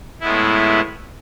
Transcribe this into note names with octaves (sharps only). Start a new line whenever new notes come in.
A2 G#3 B3 E4